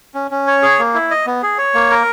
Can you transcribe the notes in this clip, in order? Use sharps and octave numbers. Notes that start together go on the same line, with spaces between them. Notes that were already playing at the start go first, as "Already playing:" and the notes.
C#4
C#4
C#5
G#4
A#3
E4
D#5
B3
G#4
C#5
A#3
A#4